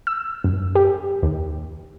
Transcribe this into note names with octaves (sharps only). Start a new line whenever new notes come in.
E6
F#2
G4
D#2